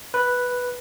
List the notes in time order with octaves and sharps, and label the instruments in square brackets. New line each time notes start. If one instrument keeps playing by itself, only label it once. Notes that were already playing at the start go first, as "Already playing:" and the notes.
[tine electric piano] B4